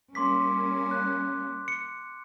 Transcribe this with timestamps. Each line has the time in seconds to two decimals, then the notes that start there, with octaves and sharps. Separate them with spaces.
0.15 G3 A#3 C#4 C6 D6 B6
0.91 F#6
1.68 C#7